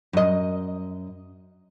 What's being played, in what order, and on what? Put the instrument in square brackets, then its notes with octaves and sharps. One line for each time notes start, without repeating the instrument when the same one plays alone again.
[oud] F#2 D#5